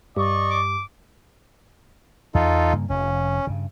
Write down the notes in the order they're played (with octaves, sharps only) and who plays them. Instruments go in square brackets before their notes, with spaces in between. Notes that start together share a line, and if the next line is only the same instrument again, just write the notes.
[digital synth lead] G2 [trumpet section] D5 D#5 C#6
[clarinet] D6
[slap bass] E2 [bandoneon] D#4 F4 A4
[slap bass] G2 C#3 A#3
[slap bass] F1 F2 [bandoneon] C#4
[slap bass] G2 C#3